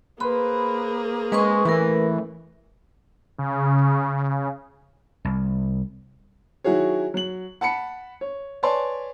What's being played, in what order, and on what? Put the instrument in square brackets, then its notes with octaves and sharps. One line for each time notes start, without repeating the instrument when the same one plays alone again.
[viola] A#3 G#4 [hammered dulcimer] B4 C5 [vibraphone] B5
[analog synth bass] G#3 [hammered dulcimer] C#4 [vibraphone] B4 C6 C#6
[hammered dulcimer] A2 [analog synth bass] E3 [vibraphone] A#4 B4
[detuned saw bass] C#3
[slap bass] C2
[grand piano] D#3 F#3 E4 F#4 G#4 C#5
F#3 F#7
F#5 A5 B5 C#7
C#5
B4 C#5 D5 G#5 A5 C6